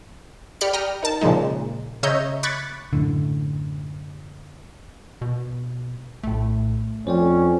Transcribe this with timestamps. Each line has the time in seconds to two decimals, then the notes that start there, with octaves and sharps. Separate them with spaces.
0.61 G4 D5 B5 F6 C#7
0.73 G5 A#5 D#6 F6
1.03 D#4 A#4 A5
1.21 A#2 C#3 F3 G#3 D#4
2.03 C#3 C#5 D#5 E5 A#5 G6
2.43 B5 C#6 D6 F#6 G#6 A6
2.93 F#2 A2 D3
5.21 B2
6.23 A#1 A2 A3
7.07 F2 C#4 C5 D5 G5